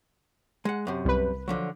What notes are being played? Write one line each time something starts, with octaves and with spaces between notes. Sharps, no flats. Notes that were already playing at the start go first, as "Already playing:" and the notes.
G#3 F#5
F#2 C3
C2 B4
D3 F3 F#3